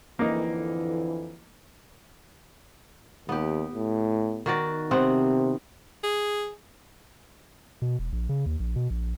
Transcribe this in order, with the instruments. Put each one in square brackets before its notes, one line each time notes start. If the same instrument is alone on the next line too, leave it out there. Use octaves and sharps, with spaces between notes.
[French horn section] F2 D3 E3 [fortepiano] A#3 D#4
[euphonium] D#2 [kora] B3 G4
[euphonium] A2
[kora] D#3 F#4 D5
[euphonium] C3 [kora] B3 C4 F#5
[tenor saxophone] G#4
[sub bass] B2
E1
A#1
C#3
D#2
A#1
B2
A#1